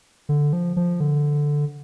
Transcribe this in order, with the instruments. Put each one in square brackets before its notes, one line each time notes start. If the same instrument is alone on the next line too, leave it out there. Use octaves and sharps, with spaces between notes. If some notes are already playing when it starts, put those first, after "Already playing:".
[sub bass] D3
F3
F3
D3